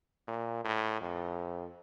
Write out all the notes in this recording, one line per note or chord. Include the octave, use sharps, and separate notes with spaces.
A#2
A2
F2